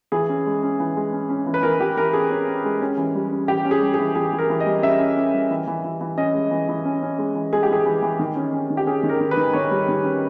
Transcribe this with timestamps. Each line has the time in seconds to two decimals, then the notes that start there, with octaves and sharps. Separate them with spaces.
0.12 E3 G#4
0.29 C#4
0.46 G#3
0.63 C#4
0.80 E3
0.97 G#3
1.13 C#4
1.29 C#4
1.46 E3
1.54 B4
1.63 E3 A#4
1.80 E3 G4
1.97 E3 A#4
2.13 C#4 G#4
2.31 C#4
2.47 C#4
2.65 G#3
2.82 C#4
2.98 E3
3.15 G3
3.31 C#4
3.48 E3 G4
3.65 C#4
3.71 G#4
3.82 G3
3.94 G#4
3.99 E3
4.15 E3 G#4
4.33 E3
4.39 A#4
4.50 E3
4.60 D#5
4.66 G3
4.82 C#4 E5
5.00 C#4
5.17 C#4
5.34 G3
5.51 E3
5.67 E3
5.84 E3
6.01 E3
6.17 C#4 D#5
6.34 G#3
6.51 E3
6.69 E3
6.85 C#4
7.02 C#4
7.19 G#3
7.35 E3
7.53 G#3 G#4
7.63 G4
7.69 E3 G#4
7.86 E3
8.02 E3
8.19 D#3
8.36 C#4
8.53 C#4
8.70 D#3
8.77 G4
8.86 C#4 G#4
9.03 D#3
9.09 A#4
9.21 D#3
9.31 B4
9.37 D#3
9.53 D#3 C#5
9.71 G3
9.88 D#3
10.04 C#4